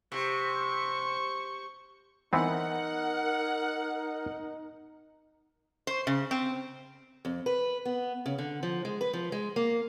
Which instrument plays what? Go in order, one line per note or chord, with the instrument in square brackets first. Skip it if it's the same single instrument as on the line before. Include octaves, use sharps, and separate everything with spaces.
[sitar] C3 [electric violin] C5 C#6
[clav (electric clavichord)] E3 B3 C4 [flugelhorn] D#4 [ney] A#4 [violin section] F#5
[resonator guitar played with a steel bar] C5
C#3
C4
[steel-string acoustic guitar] F2
B4
B3
C#3
D3
F3
G#3
B4
F3
G#3
A#3